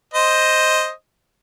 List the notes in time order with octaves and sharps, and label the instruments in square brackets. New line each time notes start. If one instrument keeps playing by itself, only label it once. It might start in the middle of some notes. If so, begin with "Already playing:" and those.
[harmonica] C5 D#5